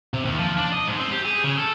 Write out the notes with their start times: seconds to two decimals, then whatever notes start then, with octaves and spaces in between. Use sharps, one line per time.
0.14 C3
0.25 D#2
0.39 F3
0.57 D4
0.72 D#5
0.87 G#2
0.99 C4
1.11 G4
1.25 G#4
1.44 C#3
1.57 A4